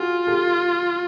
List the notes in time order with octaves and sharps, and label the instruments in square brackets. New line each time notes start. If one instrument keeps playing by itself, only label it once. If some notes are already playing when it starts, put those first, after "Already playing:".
Already playing: [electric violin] F4 [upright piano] F#4 G#4
[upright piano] G4 A4